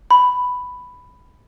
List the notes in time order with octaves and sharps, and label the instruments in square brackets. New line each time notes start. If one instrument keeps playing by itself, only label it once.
[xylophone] B5